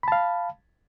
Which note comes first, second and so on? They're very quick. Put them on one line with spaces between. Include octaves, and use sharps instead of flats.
B5 A5 F5